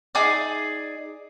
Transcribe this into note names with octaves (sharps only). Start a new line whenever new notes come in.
D#4 G#4 D5